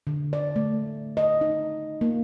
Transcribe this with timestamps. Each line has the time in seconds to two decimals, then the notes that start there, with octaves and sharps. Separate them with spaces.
0.07 D3
0.33 D5
0.56 A3
1.17 D#5
1.41 D#4
2.01 A#3